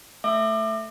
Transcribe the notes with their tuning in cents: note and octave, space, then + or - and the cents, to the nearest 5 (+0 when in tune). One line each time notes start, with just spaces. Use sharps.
A3 +0 E5 +5 D6 +30